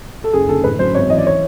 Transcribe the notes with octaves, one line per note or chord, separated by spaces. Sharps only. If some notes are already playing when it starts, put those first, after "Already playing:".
A4
F#1 G#4
D3 A4
A1 B4
F#3 C5
G#1 C#5
E3 D#5
D5
C#5